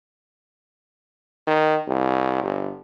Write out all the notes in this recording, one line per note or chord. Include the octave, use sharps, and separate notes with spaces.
D#3
C2
G1